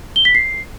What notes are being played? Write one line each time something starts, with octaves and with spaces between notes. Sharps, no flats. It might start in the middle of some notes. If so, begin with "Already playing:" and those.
G7
B6
C7